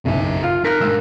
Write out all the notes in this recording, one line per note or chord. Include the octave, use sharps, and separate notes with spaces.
F#1 B1 C#3 E5
F4 F6
D#4 A#4 F#6 A#6 B6
G#2 G#3 D4 E6